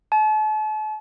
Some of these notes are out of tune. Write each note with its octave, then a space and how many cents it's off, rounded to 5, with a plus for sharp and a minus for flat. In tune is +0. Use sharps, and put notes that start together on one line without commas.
A5 -40